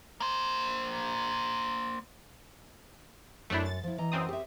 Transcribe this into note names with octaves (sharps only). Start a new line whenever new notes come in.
A#3 C5
F#2 A3 D4 E4 C#5
A6
F3 E4
E3 D#5 A#5
F#2 C4 D#6
G4 E5